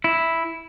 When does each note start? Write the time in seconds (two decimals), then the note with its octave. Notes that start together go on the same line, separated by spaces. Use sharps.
0.04 E4